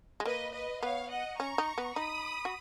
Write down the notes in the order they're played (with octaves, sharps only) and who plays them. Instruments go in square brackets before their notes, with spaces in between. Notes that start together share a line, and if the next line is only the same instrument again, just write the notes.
[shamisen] G#3
[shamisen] A#3 [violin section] B4 D#5
[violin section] B4 D#5
[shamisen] B3 [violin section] C#5 F5
[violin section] D#5 F#5
[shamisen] C#4 [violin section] A#5 C#6
[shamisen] D#4
B3
[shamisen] D#4 [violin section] B5 D#6
[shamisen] F#4